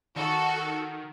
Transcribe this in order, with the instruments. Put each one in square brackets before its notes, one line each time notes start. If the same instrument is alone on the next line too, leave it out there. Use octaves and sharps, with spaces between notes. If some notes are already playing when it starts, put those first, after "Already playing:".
[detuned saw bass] D#3 [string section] F#4 A4